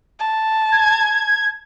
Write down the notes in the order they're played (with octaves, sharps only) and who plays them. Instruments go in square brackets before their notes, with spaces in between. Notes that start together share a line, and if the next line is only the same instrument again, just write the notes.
[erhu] A5
[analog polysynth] G#6